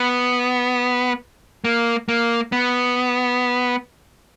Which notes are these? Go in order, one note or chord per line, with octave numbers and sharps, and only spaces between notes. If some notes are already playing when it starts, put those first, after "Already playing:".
Already playing: B3
A#3
A#3
B3